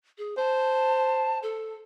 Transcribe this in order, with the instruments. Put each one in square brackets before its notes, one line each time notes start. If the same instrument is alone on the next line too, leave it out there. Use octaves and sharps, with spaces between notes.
[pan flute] G#4
[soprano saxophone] C5 [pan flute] A5
[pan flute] A4